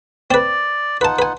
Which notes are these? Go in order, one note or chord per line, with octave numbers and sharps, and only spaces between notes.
C4 B4 D5
D#4 F4 B4 F#5 A5
B4 G#5